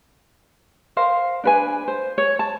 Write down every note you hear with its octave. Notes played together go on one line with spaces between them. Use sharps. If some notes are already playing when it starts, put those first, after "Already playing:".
A#4 C5 F5
D4 B4 G#5
C5
C#5
A5